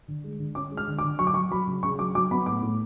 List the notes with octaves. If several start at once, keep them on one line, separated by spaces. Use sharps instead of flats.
D3
G#3
D3
C#4 D6
G#3
F6
D3
D6
D3
F#3 C#6
D6
F#3 C#6
F#3 B5
C#3
C#3 C#6
F#3 D6
F#3 D6
B3 B5
A2 D6
A2